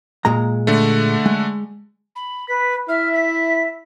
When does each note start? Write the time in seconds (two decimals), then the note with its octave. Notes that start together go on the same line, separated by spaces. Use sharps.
0.25 A#2 G#3 A#5
0.67 D3 A3
1.26 G#3
2.16 B5
2.49 B4 B6
2.89 E4 E5 F6
3.14 B6